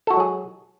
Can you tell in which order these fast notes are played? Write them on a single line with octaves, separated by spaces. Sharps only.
A4 F#4 G#3 F#3 G#4